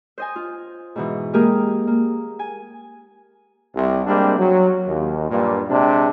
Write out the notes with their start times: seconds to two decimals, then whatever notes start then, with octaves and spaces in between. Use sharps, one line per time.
0.18 C5 D#5 G#5
0.36 F4
0.96 G#2 B2 E3
1.33 G#3 A#3 G4 G#4 A#4
1.87 A#3
2.39 G#5
3.76 C2
4.06 G3 G#3 A#3 C4 D4
4.38 F#3
4.87 D#2
5.29 G2 A#2
5.69 C3 G#3 D4